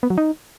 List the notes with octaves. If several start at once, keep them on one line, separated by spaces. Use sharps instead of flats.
B3
F#3
D#4